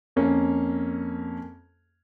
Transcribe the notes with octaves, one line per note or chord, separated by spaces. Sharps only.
F2 A#3 C#4